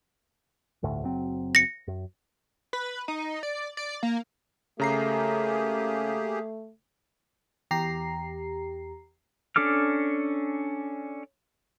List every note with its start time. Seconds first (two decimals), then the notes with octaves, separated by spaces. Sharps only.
0.83 G1 D2 A2
1.02 F#1 F#3 C4
1.55 A#6 C#7
1.88 F#2
2.73 B4
3.08 D#4
3.43 D5
3.77 D5
4.03 A#3
4.80 C#3 A3 A#3 G4 G#4 A#5 C7
7.71 E2 G4 A#5 C7
9.56 C#4 D4 A4 D6 F6